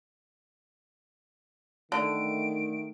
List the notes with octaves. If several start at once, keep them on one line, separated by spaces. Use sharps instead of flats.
D3 D#3 A3 D7